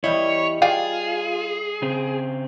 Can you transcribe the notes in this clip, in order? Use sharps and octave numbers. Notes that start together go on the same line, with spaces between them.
E2 G3 E4 C#5 D#5
F4 G#4 D5 F5 G5
C#3 C4